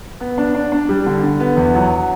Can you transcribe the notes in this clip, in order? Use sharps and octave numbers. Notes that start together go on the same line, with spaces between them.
B3
D4
D4
D4
G3
D3
D3
B3
E2
F#3